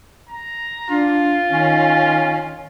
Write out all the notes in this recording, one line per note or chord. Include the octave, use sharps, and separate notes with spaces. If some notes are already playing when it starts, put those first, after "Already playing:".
A#5
D4 F4
D#3 C#4